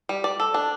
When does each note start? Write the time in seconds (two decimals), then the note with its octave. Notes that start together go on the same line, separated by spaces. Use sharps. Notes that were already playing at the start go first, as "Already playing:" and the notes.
0.09 G3
0.24 D5
0.40 A4
0.54 D4